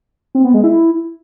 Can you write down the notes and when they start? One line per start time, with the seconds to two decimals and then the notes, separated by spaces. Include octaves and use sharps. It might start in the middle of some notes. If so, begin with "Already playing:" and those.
0.35 C4
0.44 B3
0.54 G#3
0.64 E4